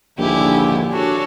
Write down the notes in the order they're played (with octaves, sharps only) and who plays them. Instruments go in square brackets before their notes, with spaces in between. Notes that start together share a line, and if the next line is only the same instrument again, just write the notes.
[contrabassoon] A#1 [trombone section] D#2 G#2 D3 [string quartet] E4 G#5 [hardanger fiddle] G4
[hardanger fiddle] D4 [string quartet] F#4 A4 C#5